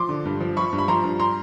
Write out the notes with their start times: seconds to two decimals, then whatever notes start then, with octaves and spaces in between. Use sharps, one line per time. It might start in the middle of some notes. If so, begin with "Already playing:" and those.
Already playing: F3 C6 D6
0.09 D3
0.25 G2
0.40 F3
0.57 F3 B5 C#6
0.73 G2
0.78 B5
0.88 F3 A#5 C6
1.04 G2
1.20 A#5 C6